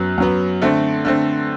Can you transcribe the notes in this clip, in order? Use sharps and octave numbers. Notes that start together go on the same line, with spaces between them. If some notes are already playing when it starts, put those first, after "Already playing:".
Already playing: F#2 F#3 B3 F#6
F#2 F#3 B3
D3 A3 C4
D3 A3 C4